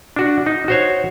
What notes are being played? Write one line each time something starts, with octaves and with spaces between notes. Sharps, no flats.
D4 F#4
D#4
F#4 C5 C#5